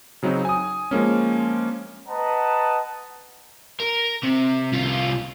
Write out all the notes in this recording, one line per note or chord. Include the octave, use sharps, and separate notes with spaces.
C#3 F#3 C4 D#4
G#5 D#6
F3 G#3 A#3 C#4
B4 D#5 F#5 A5 A#5
A#4
C3
C2 F4